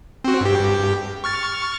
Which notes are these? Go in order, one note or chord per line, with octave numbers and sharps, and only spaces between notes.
C4 F#4
G2 G4
C#6 F6 A6